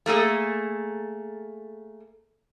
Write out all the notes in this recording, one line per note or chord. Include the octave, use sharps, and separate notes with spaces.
A3 A#3 G#4 A4